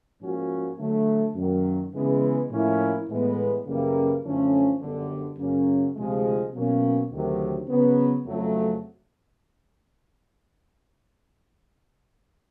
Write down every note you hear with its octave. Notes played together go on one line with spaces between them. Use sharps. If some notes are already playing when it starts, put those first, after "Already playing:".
G#2 F3 A#3 C#4 F#4
D3 F#3 A3
F#2 D#3 F#3 A#3
C#3 E3 G#3 B3
A2 F3 A#3 C#4 E4
A2 E3 G#3 B3
F#2 C#3 E3 G3 A#3
F#2 D3 F3 A3 C#4
G1 F#2 D3
F#2 C#3 F#3 A#3 C#4
D2 C3 F3 G#3
B2 F#3 A#3 C#4
D2 C3 D#3 F#3
C#3 F#3 B3
F2 C#3 F#3 A3